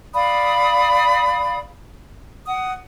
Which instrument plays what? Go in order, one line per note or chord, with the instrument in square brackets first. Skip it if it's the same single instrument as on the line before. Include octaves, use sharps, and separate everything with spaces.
[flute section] D5 F5 B5 D#6
F#5 D#6